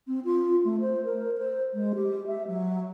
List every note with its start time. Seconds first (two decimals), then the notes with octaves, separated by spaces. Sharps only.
0.07 C4
0.24 F4
0.64 A3
0.80 C5
1.04 A#4
1.37 C5
1.73 G#3
1.95 G4
2.27 E5
2.47 F#3